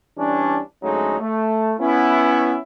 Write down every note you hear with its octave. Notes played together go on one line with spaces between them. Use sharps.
E3 G3 C#4 D4
D2 F#3 G#3 A3 C#4 D#4
A3
B3 C#4 E4